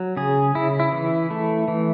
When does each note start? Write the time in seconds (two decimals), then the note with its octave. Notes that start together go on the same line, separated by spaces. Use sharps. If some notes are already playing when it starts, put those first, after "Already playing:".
Already playing: F#3
0.17 C#3 G#4
0.55 C#3 E4
0.80 E4
0.92 E3
1.30 A3
1.68 E3